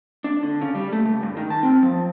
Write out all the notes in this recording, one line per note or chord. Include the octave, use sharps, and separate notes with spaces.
D4
D3
C#3
G3
A3
C#2
G2
D#3
A5
C4
F3